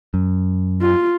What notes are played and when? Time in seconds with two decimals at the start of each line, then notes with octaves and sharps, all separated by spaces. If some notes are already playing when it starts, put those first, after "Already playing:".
0.14 F#2
0.81 F4